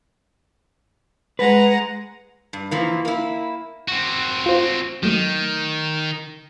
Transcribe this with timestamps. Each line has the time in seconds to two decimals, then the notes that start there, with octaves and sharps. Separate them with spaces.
1.39 G#3 B4 F#5 A#5
2.53 G2
2.71 E3 F3 A#3
3.05 A#3 E4
3.88 C4 F#4
4.46 F4 C5
5.03 D#3 F#3 A3